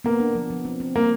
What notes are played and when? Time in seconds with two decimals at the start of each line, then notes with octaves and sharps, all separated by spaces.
0.04 A#3 B3
0.20 D4
0.35 F3
0.50 F3
0.65 C4
0.80 C4
0.96 G3 A#3